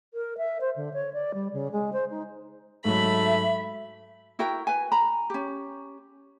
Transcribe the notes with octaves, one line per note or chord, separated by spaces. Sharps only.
A#4
E5
C5
D3
C#5
D5
G3
C#3
G#3
C5
D#4
G#2 F#3 A3 E5 B5
E4 F#4 A#4 G5
B4 G#5
A#5 B5
C#4 G4